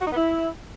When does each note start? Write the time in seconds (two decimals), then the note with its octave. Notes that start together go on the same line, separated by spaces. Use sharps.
0.01 F#4
0.06 D#4
0.11 B3
0.16 E4